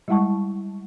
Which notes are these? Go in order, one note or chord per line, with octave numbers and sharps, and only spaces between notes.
G3 G#3 E4 F#5 A5 C#6